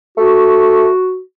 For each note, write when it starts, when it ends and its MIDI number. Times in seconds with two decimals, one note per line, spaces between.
0.17 0.88 57
0.17 1.20 66